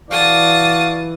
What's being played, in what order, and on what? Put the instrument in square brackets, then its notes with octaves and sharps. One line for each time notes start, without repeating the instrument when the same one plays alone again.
[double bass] E3 [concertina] F#4 F5 [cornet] D5 [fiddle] A5 D#6